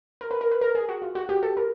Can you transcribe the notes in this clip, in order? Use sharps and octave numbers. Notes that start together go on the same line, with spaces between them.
A#4
B4
A#4
B4
A#4
G#4
F#4
F4
F#4
G4
A4
A#4